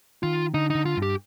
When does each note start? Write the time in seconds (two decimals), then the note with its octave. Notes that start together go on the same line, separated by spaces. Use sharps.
0.23 D#3 F4
0.54 D3 D#4
0.70 D3 D#4
0.85 F4
0.97 G2
1.02 G4